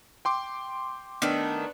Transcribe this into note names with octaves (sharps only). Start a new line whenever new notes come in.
G5 C6 D6
D#3 A3 B3 D4